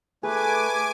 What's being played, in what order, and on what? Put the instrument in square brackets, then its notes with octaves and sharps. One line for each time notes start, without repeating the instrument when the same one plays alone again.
[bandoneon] A3 B4 [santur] G#4 [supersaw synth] G#5 D6